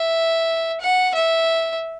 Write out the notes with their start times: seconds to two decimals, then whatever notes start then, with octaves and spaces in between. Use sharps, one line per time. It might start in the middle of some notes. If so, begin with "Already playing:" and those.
Already playing: E5
0.80 F#5
1.14 E5